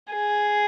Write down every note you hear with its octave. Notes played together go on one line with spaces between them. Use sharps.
G#4